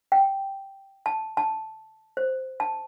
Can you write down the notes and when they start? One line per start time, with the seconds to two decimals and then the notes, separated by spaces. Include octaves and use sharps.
0.12 G5
1.06 A5
1.37 A5
2.17 C5
2.60 A5